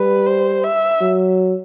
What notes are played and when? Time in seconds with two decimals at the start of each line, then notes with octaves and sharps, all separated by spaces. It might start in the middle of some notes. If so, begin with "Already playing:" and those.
Already playing: G3 B4
0.26 C5
0.63 E5
1.01 F#3